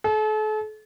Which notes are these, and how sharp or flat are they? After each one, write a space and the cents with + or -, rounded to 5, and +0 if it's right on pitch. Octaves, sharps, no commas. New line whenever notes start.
A4 -40